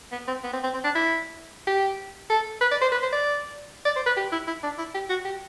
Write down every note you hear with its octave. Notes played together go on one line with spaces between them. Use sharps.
B3
C4
B3
C4
C4
C4
D4
E4
G4
A4
B4
D5
C5
B4
C5
D5
D5
C5
B4
G4
E4
E4
D4
E4
G4
F#4
G4